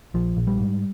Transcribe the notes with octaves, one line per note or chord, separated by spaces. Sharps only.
A#1 F3
A#1
G3
G#2